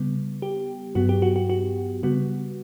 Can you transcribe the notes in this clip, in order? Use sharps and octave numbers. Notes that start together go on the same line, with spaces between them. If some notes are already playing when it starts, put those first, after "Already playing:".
Already playing: C#3 G3 B3
G4
G2 F#3 B3 F#4
G4
F#4
F#4
F#4
C#3 G3 B3 F#4